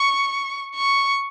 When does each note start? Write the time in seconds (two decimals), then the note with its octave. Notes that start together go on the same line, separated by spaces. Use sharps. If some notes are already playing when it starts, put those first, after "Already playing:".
Already playing: C#6
0.75 C#6